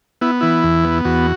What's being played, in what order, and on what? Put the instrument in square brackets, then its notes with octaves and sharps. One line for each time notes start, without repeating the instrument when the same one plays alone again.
[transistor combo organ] B3 E4
E3 E4
E2
B3
E2 F#4